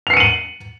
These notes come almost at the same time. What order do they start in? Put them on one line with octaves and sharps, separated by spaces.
F7 C7 C#7 D#7 F#7